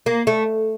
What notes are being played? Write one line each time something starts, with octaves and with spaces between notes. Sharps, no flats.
A#3
A3